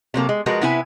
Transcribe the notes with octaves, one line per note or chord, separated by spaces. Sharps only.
C3 F#3 A#3 A4
G#3
F3 G#3 F#4 A#4 B4
C3 B3 E4 B4 G#5